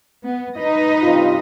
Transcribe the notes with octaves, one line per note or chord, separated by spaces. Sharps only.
B3
D#4 B4 D#5
G2 C3 F4